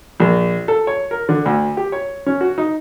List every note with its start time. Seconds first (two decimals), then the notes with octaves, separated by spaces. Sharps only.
0.20 A#1
0.68 A4
0.87 C#5
1.11 A#4
1.29 D3
1.46 D2
1.77 G4
1.92 C#5
2.26 C#4
2.41 F#4
2.58 D#4